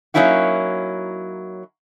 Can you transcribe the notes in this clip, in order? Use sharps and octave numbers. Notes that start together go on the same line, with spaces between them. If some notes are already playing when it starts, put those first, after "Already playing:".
F#3 A#3 C#4 D#4 E4 F#4